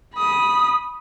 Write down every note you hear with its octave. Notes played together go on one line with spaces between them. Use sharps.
B5 D#6